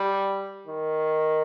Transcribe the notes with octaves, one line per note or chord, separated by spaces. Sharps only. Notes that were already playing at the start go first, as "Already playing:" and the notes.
Already playing: G3
D#3